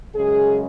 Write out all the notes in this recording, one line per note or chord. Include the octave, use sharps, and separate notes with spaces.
F#2 C#3 G#3 G#4